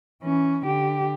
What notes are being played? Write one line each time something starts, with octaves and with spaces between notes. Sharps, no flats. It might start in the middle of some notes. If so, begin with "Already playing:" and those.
E3 C#4
D3 G4